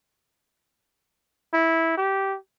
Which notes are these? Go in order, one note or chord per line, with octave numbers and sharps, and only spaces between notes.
E4
G4